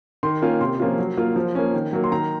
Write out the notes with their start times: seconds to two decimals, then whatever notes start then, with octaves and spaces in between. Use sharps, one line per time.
0.23 D#3 C6
0.42 A#3 C#4 F4
0.60 C3 C6
0.80 F3 A#3 C#4 F4
0.99 F#3
1.17 A#3 F4
1.36 F3
1.55 A#3 C#4
1.74 D#3
1.93 F#3 A#3
2.04 C6
2.12 D#3 A#5